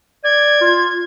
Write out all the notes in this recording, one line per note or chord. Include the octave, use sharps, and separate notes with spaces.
D5 G#6
F4